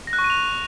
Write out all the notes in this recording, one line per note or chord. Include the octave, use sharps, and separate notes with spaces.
A#6
F#6
C#6
D#7
F7